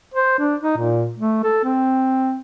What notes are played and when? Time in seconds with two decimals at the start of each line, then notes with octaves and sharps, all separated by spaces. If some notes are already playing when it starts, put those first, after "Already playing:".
0.14 C5
0.39 D4
0.61 D#4
0.78 A#2
1.17 A3
1.43 A4
1.64 C4